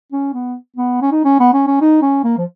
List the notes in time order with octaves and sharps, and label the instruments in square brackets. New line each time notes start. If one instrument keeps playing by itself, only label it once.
[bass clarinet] C#4
B3
B3
C#4
D#4
C#4
B3
C#4
C#4
D#4
C#4
A#3
F3